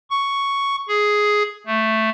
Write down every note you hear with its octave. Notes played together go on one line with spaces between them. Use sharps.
C#6
G#4
A3